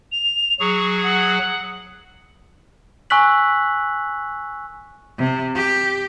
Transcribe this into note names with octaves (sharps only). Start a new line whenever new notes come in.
F7
F#3 G#4 C#6
F#5
G#5 C#6 E6 F#6 B6 F#7
C3
G4